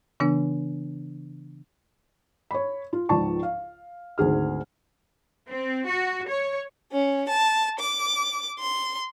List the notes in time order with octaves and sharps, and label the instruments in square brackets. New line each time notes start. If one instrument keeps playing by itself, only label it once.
[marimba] C#3 E3 B3 D4
[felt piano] C#5 B5
F4
C#2 G#2 F3 D5 A5 C#6
F5
G#1 D2 G#4 F6
[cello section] C4
F#4
C#5
[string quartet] C#4
A5
D6
C6